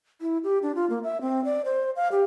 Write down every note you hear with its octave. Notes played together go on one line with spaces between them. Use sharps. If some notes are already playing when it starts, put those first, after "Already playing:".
E4
G4
D4
F4
A#3
E5
C4
D5
C5
F5
G4